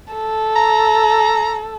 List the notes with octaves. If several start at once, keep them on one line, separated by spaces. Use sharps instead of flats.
A4
A#5